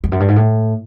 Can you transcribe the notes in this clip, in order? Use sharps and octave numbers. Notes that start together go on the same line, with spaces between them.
F2
F#2
G2
G#2
A2